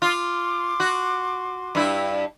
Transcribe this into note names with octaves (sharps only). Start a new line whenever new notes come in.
F4 C6 D6
F#4
G2 E4